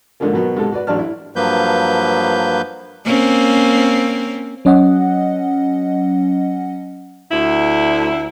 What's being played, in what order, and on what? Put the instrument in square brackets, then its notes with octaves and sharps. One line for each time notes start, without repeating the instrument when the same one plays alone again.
[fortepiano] G#2 D3 D#3 F3 A#3
B2 D#3 F#3 B3
G#2 C3 A4
F#4 B4 D5
A1 F#3 D4 D5 A5 F6
E4
[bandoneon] G2 F3 F#3 A#3 B4 G6
[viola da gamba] A#3 C4 C#4
[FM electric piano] F#3 C#4 D#5 F#5
[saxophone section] D2 E4